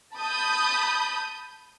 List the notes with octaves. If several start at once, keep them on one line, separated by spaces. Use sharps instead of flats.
A5 B5 D#6 G6